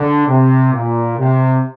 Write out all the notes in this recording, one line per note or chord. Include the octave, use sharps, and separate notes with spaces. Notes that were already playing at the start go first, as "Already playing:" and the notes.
Already playing: D3
C3
A#2
C3